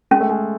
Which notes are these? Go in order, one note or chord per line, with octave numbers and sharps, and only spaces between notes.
G#3 C#4
A3
G#3